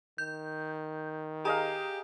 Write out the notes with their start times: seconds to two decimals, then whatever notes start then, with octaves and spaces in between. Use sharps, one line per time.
0.18 D#3 G6
1.45 G4 G#4 D#5 F5 A#5